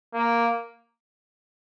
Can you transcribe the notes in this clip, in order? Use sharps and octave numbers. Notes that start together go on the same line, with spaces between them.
A#3